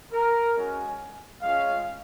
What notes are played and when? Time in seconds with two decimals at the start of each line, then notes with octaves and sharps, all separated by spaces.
0.13 A#4
0.56 G#3 C#4 F#4 G#5
1.42 G#3 C#4 F4 F5